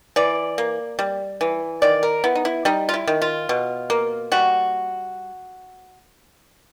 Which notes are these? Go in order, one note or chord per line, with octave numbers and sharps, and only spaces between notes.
E3 D5
A#3
G3
E3
D#3 D5
A#4
B3 E4
D#4
E4
G3 D#4
F4
E4
D#3
F4
B2
A#3
G3 F#4